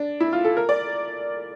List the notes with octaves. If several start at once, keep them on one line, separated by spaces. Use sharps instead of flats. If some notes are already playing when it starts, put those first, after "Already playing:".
Already playing: D4
E4
F4
A4
A#4
D5